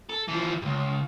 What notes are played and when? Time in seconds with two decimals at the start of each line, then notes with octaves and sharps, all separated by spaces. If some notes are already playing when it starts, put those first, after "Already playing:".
0.09 A4
0.28 E3 F3
0.62 C#2 G2